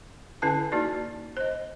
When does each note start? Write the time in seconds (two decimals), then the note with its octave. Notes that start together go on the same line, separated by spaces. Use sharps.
0.42 D3 C#4 E4 B4 A5
0.72 A#3 D#4 F#4 D5
1.37 C5 D#5